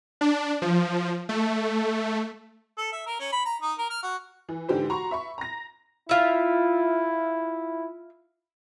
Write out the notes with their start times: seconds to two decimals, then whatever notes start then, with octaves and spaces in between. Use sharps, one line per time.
0.21 D4
0.62 F3
1.29 A3
2.78 A4
2.92 E5
3.06 A#4
3.20 C#4
3.32 B5
3.46 A#5
3.62 D#4
3.78 A#4
3.90 F6
4.03 F#4
4.49 E3
4.69 G#2 D3 E3 G4 C5
4.90 F#4 A#5 C6 C#6
5.11 E5 B5 C#6
5.38 A#5 A#6
6.09 E4 F4 E5